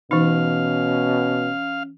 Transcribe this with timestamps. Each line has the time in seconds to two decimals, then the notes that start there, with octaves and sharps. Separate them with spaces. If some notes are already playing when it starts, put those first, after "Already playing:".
0.11 B2 E3 C#4 D#4 F5